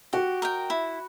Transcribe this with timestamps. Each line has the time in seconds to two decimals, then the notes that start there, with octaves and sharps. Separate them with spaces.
0.13 F#4 G4
0.42 A#4 D#5 G5
0.70 E4